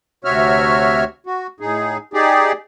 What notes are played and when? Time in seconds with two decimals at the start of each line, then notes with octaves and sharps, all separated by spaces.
0.24 D2 C3 F#4 C#5 E5 F6
1.26 F#4
1.60 A2 D#4 G#4
2.14 D#4 G4 G#4 D5